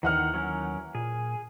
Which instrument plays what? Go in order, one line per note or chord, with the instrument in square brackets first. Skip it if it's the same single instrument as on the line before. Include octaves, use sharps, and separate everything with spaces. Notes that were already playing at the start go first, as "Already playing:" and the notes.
[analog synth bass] D#2 [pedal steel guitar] D#3 [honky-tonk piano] E3 F#5 F6
[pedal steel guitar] F#3 C#4 A#4
[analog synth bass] A#2 [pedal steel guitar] G#4